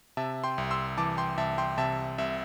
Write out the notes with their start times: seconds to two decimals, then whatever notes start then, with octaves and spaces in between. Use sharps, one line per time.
0.17 C3 E5 A5
0.44 G5 C6
0.58 C2
0.71 C6 E6
0.97 E3 A5 D6
1.17 G5 C6
1.38 C2 E5 A5
1.58 G5 C6
1.78 C3 E5 A5
2.18 C2 E5